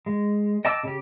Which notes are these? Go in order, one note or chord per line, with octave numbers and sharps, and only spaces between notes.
G#3
D#5 G5 A5 D6 E6
C#3 G4